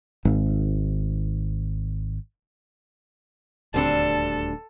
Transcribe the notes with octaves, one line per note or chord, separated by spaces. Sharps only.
G#1 G#2
D#1 D2 D3 G3 C4 D4 A4